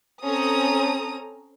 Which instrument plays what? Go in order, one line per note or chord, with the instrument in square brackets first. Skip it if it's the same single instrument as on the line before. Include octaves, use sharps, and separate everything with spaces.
[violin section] C4 C#4 A4 A#5 D#6